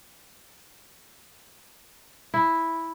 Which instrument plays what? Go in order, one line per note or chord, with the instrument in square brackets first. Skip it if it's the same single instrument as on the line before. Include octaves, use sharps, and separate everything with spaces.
[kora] E4